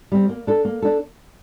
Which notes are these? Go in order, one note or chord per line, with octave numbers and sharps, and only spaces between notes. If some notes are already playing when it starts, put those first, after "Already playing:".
G3 C4
A#3
D4 A4
A#3
D4 A4